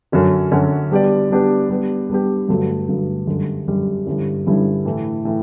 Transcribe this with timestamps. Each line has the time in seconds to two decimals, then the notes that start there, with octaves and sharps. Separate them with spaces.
0.12 F#2 D3 F#3 C#4 F#4
0.51 F#2 D3 F#3 C#4 F#4
0.92 G3 B3 D4 G4 D5
1.30 G3 B3 D4 G4 D5
1.70 G3 B3 D4 G4
2.10 G3 B3 D4 G4
2.49 G2 D3 F#3 A3
2.88 G2 D3 F#3 A3
3.27 F#2 D3 G3
3.68 F#2 D3 G3
4.06 G2 D3 G3 C#4 E4
4.46 G2 D3 G3 C#4 E4
4.85 A2 E3 A3
5.25 A2 E3